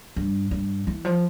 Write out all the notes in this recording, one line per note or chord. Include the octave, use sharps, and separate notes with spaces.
G2
G2
E3
F3